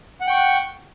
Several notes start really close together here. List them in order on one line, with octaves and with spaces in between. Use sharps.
F#5 F#6 G5 C#6